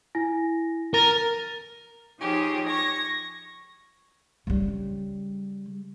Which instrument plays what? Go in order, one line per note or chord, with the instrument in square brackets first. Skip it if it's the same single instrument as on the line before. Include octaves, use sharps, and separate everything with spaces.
[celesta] E4 G#5 A#6
[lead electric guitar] A#4 [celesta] A6 A#6 D#7
[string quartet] F3 D#4 F4 G4 G#4 C#5
C#6 G#6 A#6
[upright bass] C#3 G3